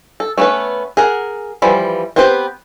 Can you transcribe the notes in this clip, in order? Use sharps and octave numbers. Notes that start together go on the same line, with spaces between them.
A4
A3 B3 C#4 D4 B4
G#4 A#4 F#5
E3 F3 G3 B5
B3 C4 G4 B4 C5